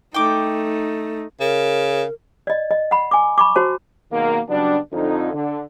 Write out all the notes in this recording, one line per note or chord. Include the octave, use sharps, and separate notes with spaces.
A3 D#4 G5 D6
C#3 A#4
D5 D#5
D#5
F#5 B5
G#5 D6
B5 C#6 D6
F#4 C5 A5
B2 D#3 F#3 G#3 A#3
C#3 F#3 G3 B3 D4
F2 D3 D#4
D3